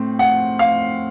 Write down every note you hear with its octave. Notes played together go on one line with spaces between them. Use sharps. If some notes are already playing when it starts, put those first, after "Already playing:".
Already playing: A2 C4
F#5
F5